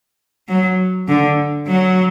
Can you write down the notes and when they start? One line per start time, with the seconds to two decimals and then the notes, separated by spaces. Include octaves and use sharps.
0.48 F#3
1.08 D3
1.67 F#3